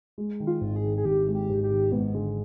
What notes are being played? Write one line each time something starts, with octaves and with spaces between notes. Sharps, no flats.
G#3
D#3
F4
G#1
G#4
D#3
G#4
G#1 G4
G#3
G4
G#1
G4
D#3
G#2 B3
D3 G#3